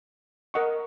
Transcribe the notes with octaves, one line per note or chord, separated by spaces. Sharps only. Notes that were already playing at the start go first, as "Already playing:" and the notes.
A#4 D#5 F#5 C#6